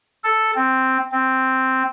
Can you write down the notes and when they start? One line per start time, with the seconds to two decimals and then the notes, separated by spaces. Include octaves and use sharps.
0.24 A4
0.55 C4
1.12 C4